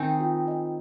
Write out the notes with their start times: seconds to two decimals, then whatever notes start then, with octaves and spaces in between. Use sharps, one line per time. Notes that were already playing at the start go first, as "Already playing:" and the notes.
Already playing: D#3 C4 D#4 G#5
0.20 F4
0.48 D#5